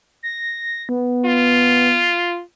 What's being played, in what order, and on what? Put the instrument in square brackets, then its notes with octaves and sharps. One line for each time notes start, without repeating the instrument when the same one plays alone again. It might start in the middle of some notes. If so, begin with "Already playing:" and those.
[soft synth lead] A#6
B3
[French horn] F4